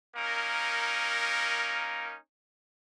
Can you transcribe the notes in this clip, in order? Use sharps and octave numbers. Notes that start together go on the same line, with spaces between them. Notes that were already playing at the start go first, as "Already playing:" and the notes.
A#3 C#4 D#4 A#4